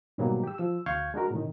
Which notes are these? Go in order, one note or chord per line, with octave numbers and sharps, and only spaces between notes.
G#2 B2 D#3 F#3 G3 A#3
G4 E6
F3 E6
D2 F5 C#6 G6 G#6
G#3 D4 F#4 A#4
A2 C3 D#3